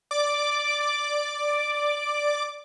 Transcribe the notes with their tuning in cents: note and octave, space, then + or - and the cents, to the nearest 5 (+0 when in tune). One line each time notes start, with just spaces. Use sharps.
D5 +0 D6 +0